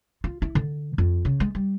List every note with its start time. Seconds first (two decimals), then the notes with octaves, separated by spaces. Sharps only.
0.24 F4
0.42 E4
0.55 D3
0.98 F2
1.25 C#3
1.40 G#3
1.55 G3